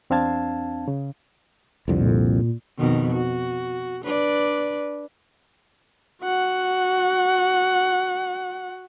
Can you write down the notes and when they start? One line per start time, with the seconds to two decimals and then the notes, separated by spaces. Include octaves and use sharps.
0.10 E2 C4 D4 F5 A5 G#6
0.88 C#3
1.88 C2 F2 D3
2.00 A#2
2.78 F2 B2 D#3
3.13 F#4
4.03 D4 B4 D5
6.22 F#4 F#5